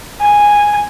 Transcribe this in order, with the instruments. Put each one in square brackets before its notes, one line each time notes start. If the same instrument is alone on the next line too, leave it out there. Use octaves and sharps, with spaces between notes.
[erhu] G#5